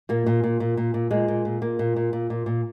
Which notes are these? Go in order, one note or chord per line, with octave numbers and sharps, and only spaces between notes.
A#2 A#3
A#2
A#2
A#2
A#2
A#2
A#2 G#3
A#2
A#2
A#2 A#3
A#2
A#2
A#2
A#2
A#2